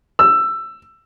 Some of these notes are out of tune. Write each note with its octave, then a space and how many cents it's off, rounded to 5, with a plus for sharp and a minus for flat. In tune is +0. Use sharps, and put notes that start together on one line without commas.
E6 +15